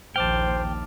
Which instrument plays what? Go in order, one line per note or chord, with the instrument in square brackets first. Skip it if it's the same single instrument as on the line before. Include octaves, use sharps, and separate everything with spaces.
[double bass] A#1 D#2 [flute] C5 [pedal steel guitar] G5 [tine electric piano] A5 D6 F6